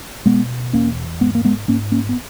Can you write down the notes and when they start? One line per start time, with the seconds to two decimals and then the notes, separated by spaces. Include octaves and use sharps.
0.26 B2 G#3 B3
0.73 E2 A#3 C#4
1.21 G#2 G#3 B3
1.35 A#3
1.44 G#3 B3
1.68 G#2 A#3 C#4
1.92 A#3 C#4
2.09 B3